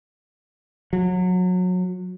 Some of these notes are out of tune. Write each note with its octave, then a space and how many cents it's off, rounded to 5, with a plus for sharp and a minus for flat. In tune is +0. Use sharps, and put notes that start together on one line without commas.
F#3 -25